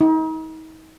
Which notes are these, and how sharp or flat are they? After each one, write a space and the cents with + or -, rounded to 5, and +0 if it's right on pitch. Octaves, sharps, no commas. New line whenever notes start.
D#4 +40